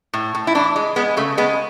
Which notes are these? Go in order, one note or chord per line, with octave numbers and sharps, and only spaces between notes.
A2
A2
E4
E3 D4
G#3
G#3 B3
C#3 A3
G#3 B3